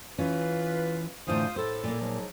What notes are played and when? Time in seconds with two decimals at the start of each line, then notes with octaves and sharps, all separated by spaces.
0.18 E3 C#4 F4 B4
1.27 A2 D3 E3 F4 C5 D#6
1.56 A2 A4 C5
1.84 A#2 A#3
2.00 G#2 F3 F#3